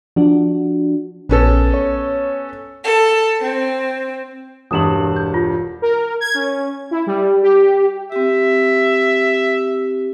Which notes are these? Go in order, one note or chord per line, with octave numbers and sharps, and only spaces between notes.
F3 D4 F#4
A#1 B3 C#4 A4
C#5
A4
C4
E1 G2 D#6 E7 F#7
G6
F4
A#4
G#6
C#4
E4
G3
G4
C4 G4 E5